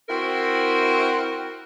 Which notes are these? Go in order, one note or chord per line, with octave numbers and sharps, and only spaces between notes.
C4 E4 F#4 A#4